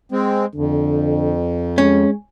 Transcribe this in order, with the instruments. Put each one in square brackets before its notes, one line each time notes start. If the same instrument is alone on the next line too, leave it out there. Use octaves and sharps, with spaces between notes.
[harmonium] G#3 C4
[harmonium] F2 [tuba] D3
[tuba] G#3 [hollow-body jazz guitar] C#4